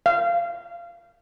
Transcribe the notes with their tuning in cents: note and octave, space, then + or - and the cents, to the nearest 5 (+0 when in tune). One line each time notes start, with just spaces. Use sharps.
F5 -20